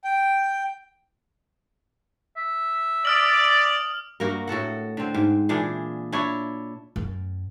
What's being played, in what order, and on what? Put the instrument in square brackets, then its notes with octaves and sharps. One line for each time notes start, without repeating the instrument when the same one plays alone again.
[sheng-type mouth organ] G5
[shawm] E5
[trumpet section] D5 [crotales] D#6 F6 F#7
[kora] G2 A#3 F#4 A#4
A2 F#4 A4 F#5
D3 C4
G#2
A#2 E3 D4 G#4
D4 E4 C#5
[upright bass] F#2